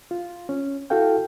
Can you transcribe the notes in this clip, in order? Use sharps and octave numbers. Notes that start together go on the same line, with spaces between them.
F4
C#4
E4 F#4 A4 F5 G5